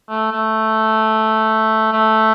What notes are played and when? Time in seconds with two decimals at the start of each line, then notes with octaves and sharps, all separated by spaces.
0.09 A3
0.32 A3
1.93 A3